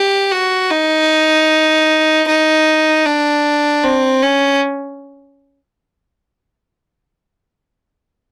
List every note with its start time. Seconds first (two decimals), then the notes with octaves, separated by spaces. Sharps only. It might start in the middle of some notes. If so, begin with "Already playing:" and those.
Already playing: G4
0.31 F#4
0.70 D#4
2.27 D#4
3.05 D4
3.84 C4
4.22 C#4